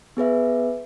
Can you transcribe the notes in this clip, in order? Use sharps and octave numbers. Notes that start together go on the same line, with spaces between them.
B3 G#4 B4 E5